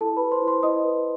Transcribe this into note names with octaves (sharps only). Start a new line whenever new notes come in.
E4 A4 A5
G4 B4 B5
C5 C6
E4
C5 C6
E4 D#5 D#6
B4